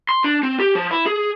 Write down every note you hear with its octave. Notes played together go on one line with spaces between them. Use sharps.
C6
D4
C4
G4
F3
E4
G#4